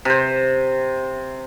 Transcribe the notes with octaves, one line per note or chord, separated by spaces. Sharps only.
C3 C5